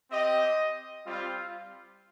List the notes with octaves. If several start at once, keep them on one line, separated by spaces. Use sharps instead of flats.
C4 G4 D#5
G3 C4 F4